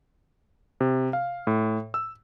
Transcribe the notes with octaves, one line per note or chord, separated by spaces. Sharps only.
C3
F5
A2
E6